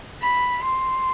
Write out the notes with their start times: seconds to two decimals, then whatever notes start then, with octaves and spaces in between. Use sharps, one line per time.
0.21 B5
0.63 C6